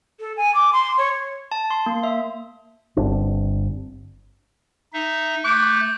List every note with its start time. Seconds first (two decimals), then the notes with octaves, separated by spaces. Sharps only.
0.20 A4
0.37 G#5
0.54 D6
0.73 C6
0.98 C#5
1.52 A5
1.71 C6
1.86 A#3
2.03 E5
2.97 G1 C4 D4
4.93 D#4 E5
5.44 A3 D6 F#6 G6